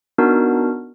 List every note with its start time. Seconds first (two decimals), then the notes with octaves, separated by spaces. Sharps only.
0.18 B3 D4 D#4 F#4 A#4